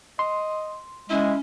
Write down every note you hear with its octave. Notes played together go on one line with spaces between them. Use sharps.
D#5 C6
G#3 C#4 E4